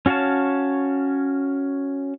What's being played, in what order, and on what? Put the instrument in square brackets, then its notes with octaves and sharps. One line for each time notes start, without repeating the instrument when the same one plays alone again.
[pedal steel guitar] C#4 F#4 C#5 F5 A5